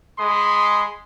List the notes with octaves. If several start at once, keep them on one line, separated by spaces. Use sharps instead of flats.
G#3 B5 C6 D#6